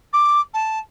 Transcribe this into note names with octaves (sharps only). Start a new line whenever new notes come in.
D6
A5